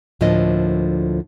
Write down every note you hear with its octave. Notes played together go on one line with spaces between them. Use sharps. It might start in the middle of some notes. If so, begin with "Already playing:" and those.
D2 A2 F3 A#3 D4 D#5